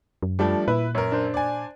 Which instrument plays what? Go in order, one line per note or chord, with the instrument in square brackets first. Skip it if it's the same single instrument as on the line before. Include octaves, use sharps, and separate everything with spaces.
[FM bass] F#2
[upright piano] F3 A3 D4 [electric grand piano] G3
[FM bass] A#2 [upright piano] E4 [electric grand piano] B4
[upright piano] F#2 A#4 [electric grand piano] C#5
[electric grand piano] D4 C5
[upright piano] D5 G#5